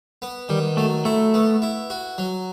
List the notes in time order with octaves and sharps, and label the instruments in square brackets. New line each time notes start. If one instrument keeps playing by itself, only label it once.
[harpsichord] B3
[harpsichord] D#3 [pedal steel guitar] G3
[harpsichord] F#3 [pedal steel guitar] A3
[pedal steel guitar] A3 [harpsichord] E4
[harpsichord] B3
E4
F#4
F#3